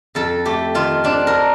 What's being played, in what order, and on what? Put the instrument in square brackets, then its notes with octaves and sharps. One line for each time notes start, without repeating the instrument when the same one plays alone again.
[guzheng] F2 A4
A3 G4
D#3 F4
C4 D4
A#4